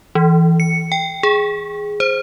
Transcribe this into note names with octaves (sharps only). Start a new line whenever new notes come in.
E3
C#7
G5
G#4
C5